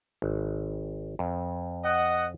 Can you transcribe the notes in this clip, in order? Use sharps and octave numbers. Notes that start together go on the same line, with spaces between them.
G#1
F2
D#5 F#5